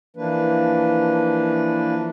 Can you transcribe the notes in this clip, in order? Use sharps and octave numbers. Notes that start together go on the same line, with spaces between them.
E3 F3 A#3 D4 B4